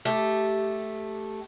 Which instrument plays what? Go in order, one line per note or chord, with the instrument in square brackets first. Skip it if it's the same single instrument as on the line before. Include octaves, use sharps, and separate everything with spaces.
[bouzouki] A3 G4